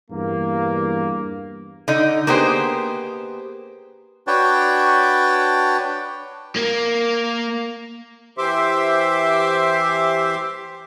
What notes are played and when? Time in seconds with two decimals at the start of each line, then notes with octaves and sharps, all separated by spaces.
0.11 E2 G2 A#3
1.88 D3 D#4
2.27 A#3 B3 G4 G#4 C5
4.27 D4 F#4 B4 C#5 G5 A5
6.56 A#3
8.38 E3 G4 C5 E5 C6 D6